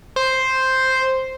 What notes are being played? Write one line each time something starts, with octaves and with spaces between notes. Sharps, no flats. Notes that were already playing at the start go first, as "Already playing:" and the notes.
C5